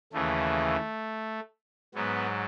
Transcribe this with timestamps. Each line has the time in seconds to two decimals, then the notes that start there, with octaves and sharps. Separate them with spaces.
0.13 D#2 C#3 E3 A3
1.94 G#2 F#3 B3